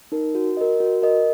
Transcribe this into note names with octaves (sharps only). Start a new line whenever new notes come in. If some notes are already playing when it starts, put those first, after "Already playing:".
D#4 A#4
F#4
A#4 D#5
F#4
A#4 D#5